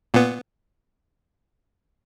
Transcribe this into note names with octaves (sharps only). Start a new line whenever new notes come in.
A#2 B3